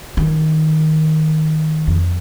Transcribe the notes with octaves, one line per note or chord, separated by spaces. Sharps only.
D#3
F2